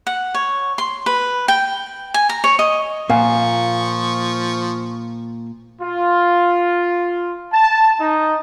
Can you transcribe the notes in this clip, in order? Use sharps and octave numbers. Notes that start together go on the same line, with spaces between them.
F#5
C#5
C6
B4
G5
G#5
A#5
C#5
D#5
A#2 F3 F5 G#5 C#6
F4
A5
D#4